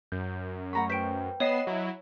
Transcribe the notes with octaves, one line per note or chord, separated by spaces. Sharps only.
F#2 G6
A3 F#5 A#5 B5 C#6
B4 C5 G5 B6 D7
B3 C#5 D#5 B5 C7 E7
F#3 E4